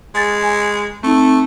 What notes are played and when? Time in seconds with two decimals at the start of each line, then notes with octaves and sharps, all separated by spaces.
0.15 G#3 G#5 A6
0.43 G#5
1.03 A3 C4 D#4